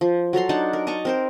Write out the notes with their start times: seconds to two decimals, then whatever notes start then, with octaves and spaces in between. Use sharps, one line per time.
0.01 F3
0.33 F#3 A4 A#5 C6
0.49 D4 D#4 F#5 A5
0.73 A#4
0.87 D#5 A5 A#5 C#6
1.05 C4 A#4 C5